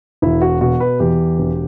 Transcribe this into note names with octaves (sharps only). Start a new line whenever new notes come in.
E1 E4
F#4
B2 F#4
B4
E2 G4
E1